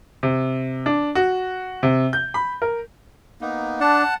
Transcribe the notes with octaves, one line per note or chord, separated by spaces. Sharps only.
C3
D4
F#4
C3
G6
B5
A#4
A#3 B3 D#4
D4 F#5 A5